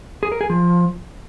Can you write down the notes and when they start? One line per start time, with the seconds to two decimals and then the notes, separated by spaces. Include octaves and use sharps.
0.23 G#4
0.32 A#4
0.41 G#4
0.50 F3